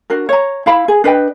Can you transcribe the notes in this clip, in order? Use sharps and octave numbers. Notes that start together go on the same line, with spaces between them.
D4 F#4 A#4
C#5 A#5
E4 F5 B5
G#4
D4 B4 D#5 G5